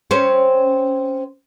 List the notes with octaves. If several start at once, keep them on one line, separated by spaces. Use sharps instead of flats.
C4 C#4